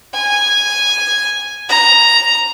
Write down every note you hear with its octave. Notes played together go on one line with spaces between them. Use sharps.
G#5
A#5